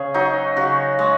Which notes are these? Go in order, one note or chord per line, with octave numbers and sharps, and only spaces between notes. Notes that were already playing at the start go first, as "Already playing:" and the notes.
Already playing: C#3 G#4
F#3 D#4
C#3 F#4
G#3